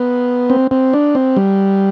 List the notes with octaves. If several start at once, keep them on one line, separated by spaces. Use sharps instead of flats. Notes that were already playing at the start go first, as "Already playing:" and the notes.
Already playing: B3
C4
C4
D4
C4
G3